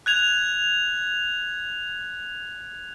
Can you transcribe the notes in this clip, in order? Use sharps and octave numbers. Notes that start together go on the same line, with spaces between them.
F#6 G#6 F7